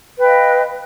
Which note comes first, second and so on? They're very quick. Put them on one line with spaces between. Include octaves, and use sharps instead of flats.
B4 G5 D#5 F5